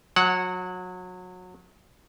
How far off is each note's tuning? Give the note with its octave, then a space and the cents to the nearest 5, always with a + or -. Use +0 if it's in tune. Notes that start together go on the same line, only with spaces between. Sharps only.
F#3 -25 F#5 +0